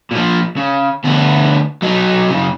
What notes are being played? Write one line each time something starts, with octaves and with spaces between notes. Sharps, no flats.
A#2 F3
C#3
D2 B3
F#3 D#4
F#2 C#3